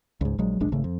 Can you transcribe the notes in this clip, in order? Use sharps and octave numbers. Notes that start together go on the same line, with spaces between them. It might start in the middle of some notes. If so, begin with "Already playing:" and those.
C#2 G#2
A#1 F#3 G#3
F#1 B1 G#3 D4
G#1 C#3 A3
F2